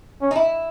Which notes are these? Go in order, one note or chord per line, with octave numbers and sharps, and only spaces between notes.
C#4
D#4
E4